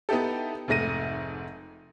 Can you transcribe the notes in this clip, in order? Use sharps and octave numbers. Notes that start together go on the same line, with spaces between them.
B3 D#4 E4 G4 A4
F1 G#2 A3 A#6 D#7